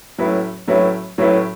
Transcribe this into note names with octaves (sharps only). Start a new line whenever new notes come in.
A2 F#3 C#4 E4 B4
A2 F#3 C#4 E4 B4
A2 F#3 C#4 E4 B4